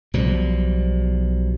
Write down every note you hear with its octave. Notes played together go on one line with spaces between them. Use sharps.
B1 B2 F3 G3